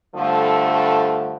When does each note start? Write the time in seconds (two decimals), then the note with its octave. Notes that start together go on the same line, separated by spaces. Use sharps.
0.16 G2 D3 F3 A3